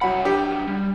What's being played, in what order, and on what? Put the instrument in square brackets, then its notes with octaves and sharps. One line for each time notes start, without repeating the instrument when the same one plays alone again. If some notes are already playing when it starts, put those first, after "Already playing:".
[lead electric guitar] C2 F#5 [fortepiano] F#3 B5
[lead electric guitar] F#3 D4 [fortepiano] G4
[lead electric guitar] G3